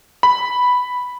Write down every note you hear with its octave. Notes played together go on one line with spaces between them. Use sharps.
B5